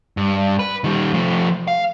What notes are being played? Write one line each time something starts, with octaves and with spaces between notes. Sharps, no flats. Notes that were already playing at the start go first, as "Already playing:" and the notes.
G2
B4
D#3 G3
F3 A3
F5